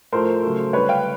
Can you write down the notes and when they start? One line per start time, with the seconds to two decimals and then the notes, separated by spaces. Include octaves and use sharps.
0.12 A2 F3 A3 A#4 C5
0.43 C#3 F#3 A3
0.73 D3 G3 B4 C#5
0.89 F5 G5